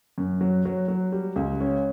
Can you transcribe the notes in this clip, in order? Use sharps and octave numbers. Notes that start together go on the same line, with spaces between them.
F#2
F#3
F#3
F#3
G3
C#2
C#4